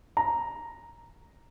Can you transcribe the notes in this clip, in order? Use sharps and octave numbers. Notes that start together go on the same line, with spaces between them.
A#5